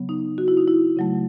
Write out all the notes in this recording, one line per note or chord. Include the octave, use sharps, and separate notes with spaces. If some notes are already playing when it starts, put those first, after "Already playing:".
Already playing: C#3 F#3 B3
D#4
F#4
E4
D#4
E4
C#3 F#3 A3